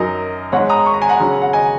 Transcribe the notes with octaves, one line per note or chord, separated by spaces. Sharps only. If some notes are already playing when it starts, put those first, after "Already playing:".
Already playing: F#2 F#3 D#4 A#4 D#5
G#2 G#3 D#4 C#5 F#5
A#5 D#6
C#6
A#5
G#5
F#5 A#5
C#3 F#3 C#4
F#5
D#5 G#5